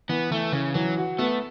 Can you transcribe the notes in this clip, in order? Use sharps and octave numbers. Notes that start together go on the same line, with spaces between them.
E3 B3
E3 A3
C#3 E3
E3 F#3
F#4
A3 B3